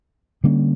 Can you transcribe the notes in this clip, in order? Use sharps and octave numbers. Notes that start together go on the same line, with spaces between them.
D3 G3 A#3 C#4